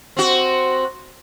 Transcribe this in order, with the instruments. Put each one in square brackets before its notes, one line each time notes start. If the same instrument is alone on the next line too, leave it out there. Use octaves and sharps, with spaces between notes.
[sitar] C4 F#4